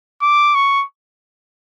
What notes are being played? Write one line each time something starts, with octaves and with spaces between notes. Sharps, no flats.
D6
C#6